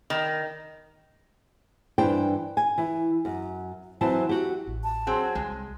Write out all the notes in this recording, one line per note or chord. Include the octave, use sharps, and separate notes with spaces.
D#3
G2 E3 D4 C5 G5
G#5
E3
F#2
E3 F#3 C4 A5
F#4 G4
A1
A5
F#3 C4 G#4
C2 G#3